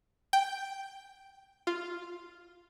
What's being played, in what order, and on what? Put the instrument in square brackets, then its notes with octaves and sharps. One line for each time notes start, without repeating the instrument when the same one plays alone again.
[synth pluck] G5
F4